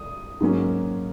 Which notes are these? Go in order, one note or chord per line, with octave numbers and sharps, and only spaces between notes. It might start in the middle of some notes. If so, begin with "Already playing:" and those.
Already playing: D#6
G#2 F#3 A#3 C#4